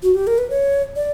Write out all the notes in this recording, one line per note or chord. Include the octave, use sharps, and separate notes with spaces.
F#4
G4
A#4
B4
C#5
D5